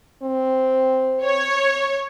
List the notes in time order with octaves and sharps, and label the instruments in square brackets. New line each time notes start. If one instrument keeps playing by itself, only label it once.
[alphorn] C4
[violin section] C#5